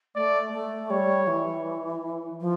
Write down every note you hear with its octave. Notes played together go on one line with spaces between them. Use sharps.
A3 D5
A3
G3 C#5
E3
F3